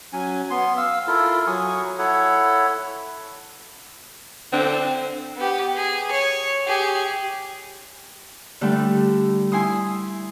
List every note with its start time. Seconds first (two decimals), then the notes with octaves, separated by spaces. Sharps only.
0.13 F#3 C#4 G#5
0.50 B3 C6
0.77 F5 E6
1.08 E4 F4 A4 A#4
1.47 F#3 G#5 C#6 D#6
1.99 E4 A4 C#5 F#5
4.53 D3 C4
5.36 B3 G4
5.76 G#4
6.11 C#5
6.66 G4 G#4
8.61 D3 G3 A3
9.52 E4 G#5 C6 D#6